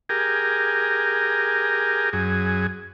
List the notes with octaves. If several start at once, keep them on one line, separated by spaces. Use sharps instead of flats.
G4 G#4 A#4
F#2 G#4